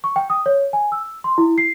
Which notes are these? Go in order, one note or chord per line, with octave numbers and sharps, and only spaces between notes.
C#6
G5
D#6
C#5
G#5
E6
C6
E4
C7